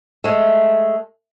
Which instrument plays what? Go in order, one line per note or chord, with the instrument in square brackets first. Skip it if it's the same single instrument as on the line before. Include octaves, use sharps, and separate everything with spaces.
[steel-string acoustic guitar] G#3 A3